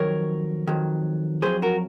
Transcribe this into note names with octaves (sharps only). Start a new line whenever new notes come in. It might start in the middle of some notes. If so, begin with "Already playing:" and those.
Already playing: F2 D#3 F#3 A#4 C#5
F2 D#3 F#3
F2 D#3 F#3 G#4 C5
F#4 A#4